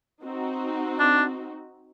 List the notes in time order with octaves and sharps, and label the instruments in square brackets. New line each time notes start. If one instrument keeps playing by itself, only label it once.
[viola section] C4 D#4 F#4
[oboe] D4